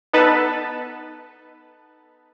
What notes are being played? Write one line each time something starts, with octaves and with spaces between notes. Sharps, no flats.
B3 D#4 A4 B4 A5